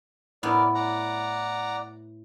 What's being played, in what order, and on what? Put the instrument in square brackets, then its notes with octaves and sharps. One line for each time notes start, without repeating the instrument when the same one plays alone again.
[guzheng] A2 B3 [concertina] A#4 D5
[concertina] D5 F#5 A#5